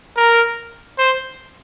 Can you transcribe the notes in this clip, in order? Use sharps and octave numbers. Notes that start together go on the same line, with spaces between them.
A#4
C5